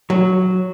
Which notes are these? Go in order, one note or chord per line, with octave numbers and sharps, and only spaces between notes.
F#3